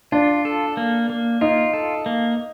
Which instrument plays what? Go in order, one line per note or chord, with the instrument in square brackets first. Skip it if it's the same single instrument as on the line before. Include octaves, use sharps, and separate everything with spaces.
[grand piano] D4 [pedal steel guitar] F4
[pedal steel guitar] A4
A#3
A#3
[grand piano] D#4 [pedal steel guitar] F4
[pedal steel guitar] A4
A#3